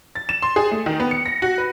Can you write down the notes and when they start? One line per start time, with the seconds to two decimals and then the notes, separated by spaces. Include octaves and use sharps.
0.15 A6
0.29 E7
0.42 C6
0.56 G#4
0.71 A3
0.86 D#3
1.00 B3
1.11 C#7
1.26 A#6
1.42 F#4
1.58 B4